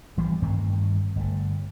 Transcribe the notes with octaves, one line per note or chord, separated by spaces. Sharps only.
G#1 E3 G3 B3
G2 D#3 A3 C4
G1 A3